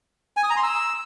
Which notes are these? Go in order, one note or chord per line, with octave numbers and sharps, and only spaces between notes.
G#5
D#6
A#5
C6
E6